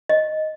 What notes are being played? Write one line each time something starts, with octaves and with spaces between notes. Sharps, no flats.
D#5